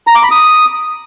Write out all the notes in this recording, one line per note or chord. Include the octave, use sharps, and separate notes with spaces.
A#5
D6
B5
D#6